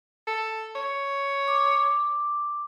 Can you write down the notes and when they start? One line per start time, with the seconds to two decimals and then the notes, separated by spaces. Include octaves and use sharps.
0.27 A4
0.76 C#5
1.48 D6